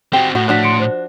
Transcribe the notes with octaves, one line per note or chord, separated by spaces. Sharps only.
C4 F#4 G4
A2 F#4
F3 D4 F#4 F#6 B6
C6 C#7 D7
C5